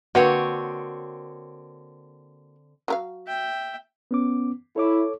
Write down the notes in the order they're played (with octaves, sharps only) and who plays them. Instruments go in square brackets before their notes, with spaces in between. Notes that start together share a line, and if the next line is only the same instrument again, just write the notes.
[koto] D3 C4 C#5 [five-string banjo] A#3 F#4 [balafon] B4
[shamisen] F#3 A#4 F5
[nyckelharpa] E5 G5
[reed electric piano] B3 C#4 D6
[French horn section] E4 [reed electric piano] A4 C#5 D6